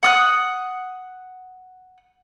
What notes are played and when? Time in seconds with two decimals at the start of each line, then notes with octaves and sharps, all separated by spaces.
0.03 F#5 D#6 F#6